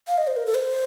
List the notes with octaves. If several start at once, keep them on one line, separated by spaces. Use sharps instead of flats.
F5
D#5
C5
A#4
A4
C5